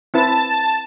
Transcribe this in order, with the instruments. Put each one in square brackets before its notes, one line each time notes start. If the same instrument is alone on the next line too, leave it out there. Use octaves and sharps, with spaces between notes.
[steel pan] C4 E4 B4 [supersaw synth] A5